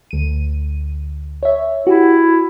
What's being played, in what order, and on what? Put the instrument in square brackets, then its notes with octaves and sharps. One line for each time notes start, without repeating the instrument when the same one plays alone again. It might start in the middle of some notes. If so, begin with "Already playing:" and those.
[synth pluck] D2 D#7
C#5 E5
[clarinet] E4 [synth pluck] F#4 G4